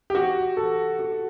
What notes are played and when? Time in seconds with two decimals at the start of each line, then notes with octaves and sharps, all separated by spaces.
0.10 G4
0.15 F#4
0.57 A4
0.99 F#4